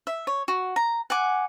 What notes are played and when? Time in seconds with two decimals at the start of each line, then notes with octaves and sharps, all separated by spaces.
0.07 E5
0.27 C#5
0.48 F#4
0.76 A#5
1.10 F#5 G#5 D6